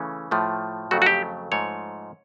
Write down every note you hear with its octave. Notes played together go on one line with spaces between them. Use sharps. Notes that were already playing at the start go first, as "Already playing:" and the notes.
Already playing: C#3 E3 A3 C#4
A2 F3 A3
F2 C#3 F#3 A3 C4 F#4
F#4
G4
G#2 F3 A3 C#5